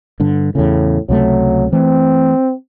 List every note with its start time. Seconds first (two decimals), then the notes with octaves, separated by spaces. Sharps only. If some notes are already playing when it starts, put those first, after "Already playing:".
0.20 G2 D3
0.55 E2 A2 C#3
1.09 C#2 C3 F#3 A3
1.72 E3 A3 C4